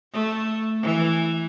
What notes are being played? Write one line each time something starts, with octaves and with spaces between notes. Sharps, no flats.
A3
E3